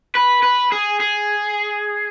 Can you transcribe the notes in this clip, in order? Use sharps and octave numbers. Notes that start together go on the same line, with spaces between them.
B4
B4
G#4
G#4